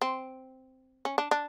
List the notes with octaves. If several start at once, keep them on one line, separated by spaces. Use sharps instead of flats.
C4
C#4
D4
D4